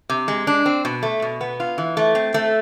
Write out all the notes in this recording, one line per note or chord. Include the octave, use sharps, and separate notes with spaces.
C3
G#3
D4
C4
B2
A3
B2
B3
F4
E3
A3
C4
A3